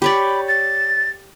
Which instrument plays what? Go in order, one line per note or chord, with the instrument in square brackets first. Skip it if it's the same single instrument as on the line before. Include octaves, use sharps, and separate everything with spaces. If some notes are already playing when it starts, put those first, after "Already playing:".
[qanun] G4 C#5 D5 [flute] B5
[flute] A6